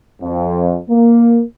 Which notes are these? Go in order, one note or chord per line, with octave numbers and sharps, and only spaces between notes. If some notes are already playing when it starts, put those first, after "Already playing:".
F2
A#3